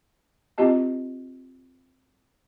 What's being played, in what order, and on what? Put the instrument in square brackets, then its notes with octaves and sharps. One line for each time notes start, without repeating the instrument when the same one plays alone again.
[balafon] C4 E4 F4 G4 D#5 A5